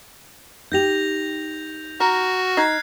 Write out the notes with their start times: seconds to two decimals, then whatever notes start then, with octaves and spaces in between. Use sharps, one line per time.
0.72 D#4 G4 G6 A#6 F7
2.00 F#4 A#5 F6
2.57 D#4 F#6 G#6 C7